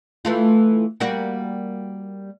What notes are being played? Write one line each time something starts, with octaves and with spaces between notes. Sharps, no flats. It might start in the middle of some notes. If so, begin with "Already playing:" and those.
E3 A3 F4
G3 A#3 F#4